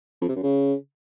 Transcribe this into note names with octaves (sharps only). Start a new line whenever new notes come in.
F2
C3
F#2
C#3